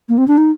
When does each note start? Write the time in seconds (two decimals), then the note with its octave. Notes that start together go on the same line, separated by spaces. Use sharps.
0.09 A#3
0.18 C4
0.28 D4
0.38 D#4